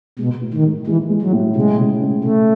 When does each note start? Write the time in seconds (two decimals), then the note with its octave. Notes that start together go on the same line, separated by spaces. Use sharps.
0.19 B2 G#3
0.41 A2
0.53 D#3
0.65 G#3
0.87 E3 G#3
1.10 G#3
1.21 F#3
1.33 A2
1.55 C#3 G#3
1.78 C#3
2.01 C#4
2.24 C#3 A3